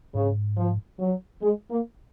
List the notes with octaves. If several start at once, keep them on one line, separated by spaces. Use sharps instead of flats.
G#2 C#3
F3
F#3
G#3
A#3